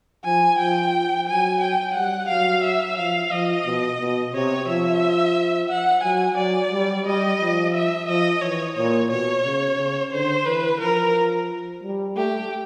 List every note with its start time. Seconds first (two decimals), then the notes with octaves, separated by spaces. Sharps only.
0.25 F3 G#5
0.59 F3 G5
1.27 F#3 G#5
1.61 G5
1.95 G3 F#5
2.29 F#3 F5
2.64 E5
2.98 F3 F5
3.31 F3 D#5
3.65 B2
4.00 B2
4.33 C3 C#5
4.68 F3 E5
5.70 F#5
6.04 F#3 G#5
6.38 F#3 D5
6.72 G3
7.06 G3 D#5
7.40 F3
7.74 E5
8.08 F3 D#5
8.41 E3 C#5
8.76 A#2 C#5
9.10 B2 C#5
9.44 C#3
9.78 C#3
10.12 D3 C5
10.46 E3 B4
10.80 F3 A#4
11.83 G3
12.16 A3 G4